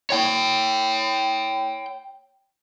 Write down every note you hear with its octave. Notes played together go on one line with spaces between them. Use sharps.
C#5 G5